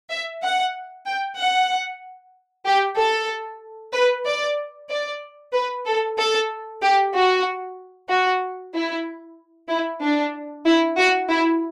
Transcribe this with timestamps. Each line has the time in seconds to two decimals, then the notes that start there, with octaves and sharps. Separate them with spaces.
0.10 E5
0.42 F#5
1.06 G5
1.38 F#5
2.66 G4
2.97 A4
3.94 B4
4.26 D5
4.90 D5
5.53 B4
5.86 A4
6.18 A4
6.82 G4
7.13 F#4
8.09 F#4
8.74 E4
9.69 E4
10.01 D4
10.65 E4
10.97 F#4
11.30 E4